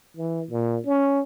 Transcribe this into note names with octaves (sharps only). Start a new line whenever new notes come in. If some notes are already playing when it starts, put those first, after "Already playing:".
E3
A#2
C#4